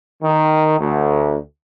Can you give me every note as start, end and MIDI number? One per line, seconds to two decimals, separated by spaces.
0.22 0.78 51
0.80 1.37 38